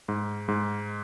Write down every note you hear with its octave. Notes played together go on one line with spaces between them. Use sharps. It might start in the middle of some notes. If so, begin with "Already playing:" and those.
G#2
G#2